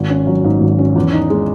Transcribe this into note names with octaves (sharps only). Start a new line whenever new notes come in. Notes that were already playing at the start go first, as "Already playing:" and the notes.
Already playing: G#1
C#4
F#3
G#2
G#1
C#4
E2
D#4
G#3